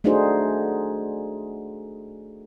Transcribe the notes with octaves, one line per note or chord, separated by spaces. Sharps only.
A3 D4 D#4 F#4 G#4 C5